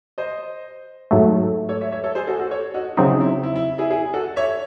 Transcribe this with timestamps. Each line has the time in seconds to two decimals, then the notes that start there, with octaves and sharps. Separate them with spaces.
0.18 C5 D#5
1.11 G#2 F#3 A3
1.69 A4 C#5
1.81 C#5 E5
1.92 C#5 E5
2.04 A4 C#5
2.15 G#4 C5
2.27 F#4 A4
2.39 F#4 A4
2.51 A4 C#5
2.74 D#4 F#4
2.97 C#3 F#3 C4 D#4 E4
3.20 E4
3.43 E4
3.56 E4
3.78 E4 G#4
3.90 E4 G#4
4.14 F#4 A4
4.36 C#5 E5